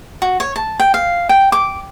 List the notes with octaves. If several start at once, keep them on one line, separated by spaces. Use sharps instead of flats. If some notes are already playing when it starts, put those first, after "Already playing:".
F#4
C#5
A5
G5
F5
G5
D6